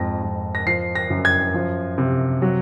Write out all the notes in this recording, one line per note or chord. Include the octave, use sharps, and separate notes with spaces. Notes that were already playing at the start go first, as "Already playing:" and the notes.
Already playing: F2 G#2 A#6
F2
A#6
F3 C7
A#6
F#2
G#6
F3
C3
F#3